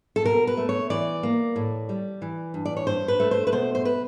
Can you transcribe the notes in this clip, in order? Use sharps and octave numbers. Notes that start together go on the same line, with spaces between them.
A4
B2 A#4
B4
A3
C#5
E3 D5
A#3
A2
G3
E3
G2
D5
C#5
G2 C5
B4
A3
C5
B4
B2 C5
C5
B4